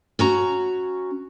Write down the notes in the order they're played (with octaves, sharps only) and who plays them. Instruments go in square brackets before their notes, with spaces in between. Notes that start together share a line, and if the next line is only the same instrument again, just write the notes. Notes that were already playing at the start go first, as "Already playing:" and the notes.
[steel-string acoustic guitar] C#4 F#4 A#5